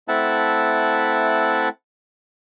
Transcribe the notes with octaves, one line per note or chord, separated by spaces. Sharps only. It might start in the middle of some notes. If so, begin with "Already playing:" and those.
A3 C4 E4 E5 F#5 A5